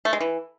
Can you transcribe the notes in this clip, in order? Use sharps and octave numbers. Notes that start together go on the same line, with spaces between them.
A3
G#3
E3